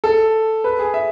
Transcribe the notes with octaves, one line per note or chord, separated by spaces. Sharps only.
A4
B4
G#4
E5